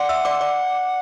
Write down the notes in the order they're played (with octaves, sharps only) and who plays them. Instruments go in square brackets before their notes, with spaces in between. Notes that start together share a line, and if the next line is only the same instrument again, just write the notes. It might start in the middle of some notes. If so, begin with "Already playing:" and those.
Already playing: [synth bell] D5 C6 D6 [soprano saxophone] F#5
[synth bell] E5 E6
D5 D6
D5 D6